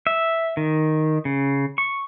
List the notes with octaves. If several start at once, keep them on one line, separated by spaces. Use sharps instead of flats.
E5
D#3
C#3
C#6